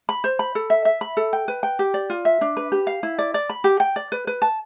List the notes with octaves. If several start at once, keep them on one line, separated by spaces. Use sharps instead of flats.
B5
C5
B5
A4
E5
E5
B5
A4
G5
B4
G5
G4
D5
F4
E5
D4
B4
G4
F5
E4
D5
D5
B5
G4
G5
D5
B4
B4
A5